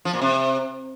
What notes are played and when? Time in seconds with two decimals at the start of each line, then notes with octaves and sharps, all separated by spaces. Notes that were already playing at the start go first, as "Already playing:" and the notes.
0.05 F3
0.13 A#2
0.22 C3